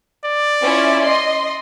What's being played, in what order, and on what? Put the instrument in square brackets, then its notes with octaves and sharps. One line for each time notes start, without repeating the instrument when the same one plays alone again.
[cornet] D5
[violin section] C#4 E4 F4
D#5 C6